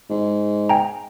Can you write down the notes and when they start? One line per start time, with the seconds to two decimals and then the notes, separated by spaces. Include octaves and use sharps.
0.10 G#2
0.69 G5 G#5 A#5